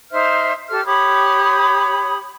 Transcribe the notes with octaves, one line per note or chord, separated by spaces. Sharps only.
D#4 C5 E5 F6
G4 A4 F6
G4 C#5 B5 D#6